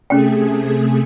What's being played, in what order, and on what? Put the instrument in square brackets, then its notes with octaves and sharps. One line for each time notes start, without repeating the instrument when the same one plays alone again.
[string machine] C3 A3 G#4 [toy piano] C#4 G5